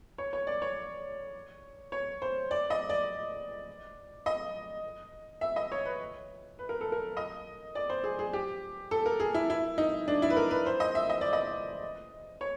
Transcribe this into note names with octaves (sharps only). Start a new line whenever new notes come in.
C#5
C#5
D5
C#5
C#5
C5
D5
D#5
D5
D#5
E5
D#5
C#5
B4
B4
A#4
A4
A#4
D#5
D5
C5
G#4
G#4
G4
A4
A#4
G#4
E4
E4
D#4
D4
E4
B4
A#4
B4
C5
D#5
E5
D#5
D5
D#5
C#5